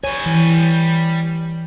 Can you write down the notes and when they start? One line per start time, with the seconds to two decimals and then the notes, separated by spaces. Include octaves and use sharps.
0.04 G3 C#5 G#5
0.26 E3